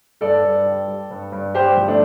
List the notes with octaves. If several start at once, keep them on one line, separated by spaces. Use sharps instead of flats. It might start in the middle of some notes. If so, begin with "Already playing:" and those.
G2 A4 D5
G2
G3
G3
G2
G2
G2 G4 C5
F3
A3 D4